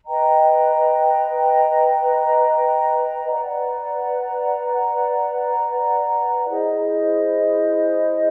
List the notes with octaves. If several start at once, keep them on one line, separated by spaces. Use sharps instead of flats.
B4 D#5 G5 A#5
B4 D5 F#5 A#5
E4 G#4 C5 D#5